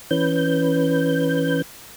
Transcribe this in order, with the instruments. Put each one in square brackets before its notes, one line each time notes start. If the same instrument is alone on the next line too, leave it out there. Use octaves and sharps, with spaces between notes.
[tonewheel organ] E3 C#4 B4 G6